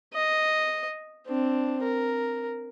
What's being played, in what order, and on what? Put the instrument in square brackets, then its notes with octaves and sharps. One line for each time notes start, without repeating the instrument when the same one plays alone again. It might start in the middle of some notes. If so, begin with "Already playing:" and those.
[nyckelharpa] D#5
C4 D4
A#4